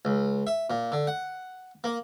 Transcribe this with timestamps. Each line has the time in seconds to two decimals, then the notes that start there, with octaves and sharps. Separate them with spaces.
0.05 C#2
0.47 E5
0.70 A#2
0.92 D3
1.07 F#5
1.84 A#3